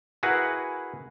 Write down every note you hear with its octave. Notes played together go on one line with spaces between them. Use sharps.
E4 F#4 G#4 A#4 B4 F#5